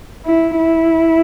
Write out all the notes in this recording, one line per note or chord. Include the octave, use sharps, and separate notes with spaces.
E4
E4